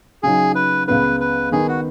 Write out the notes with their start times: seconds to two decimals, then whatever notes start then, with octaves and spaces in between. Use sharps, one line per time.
0.23 C#3 F#3 D#4 G#4
0.55 B4
0.87 C#2 C#3 B3 B4
1.20 B4
1.52 D#3 B3 D#4 G#4
1.68 F#4